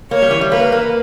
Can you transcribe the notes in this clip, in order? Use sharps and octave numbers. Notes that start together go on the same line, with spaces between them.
A#3 C#5
G3
E3
G3
A#3 B4
A#3